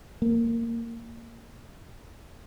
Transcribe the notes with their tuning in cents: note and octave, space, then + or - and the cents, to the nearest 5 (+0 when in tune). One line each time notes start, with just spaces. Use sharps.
A#3 -15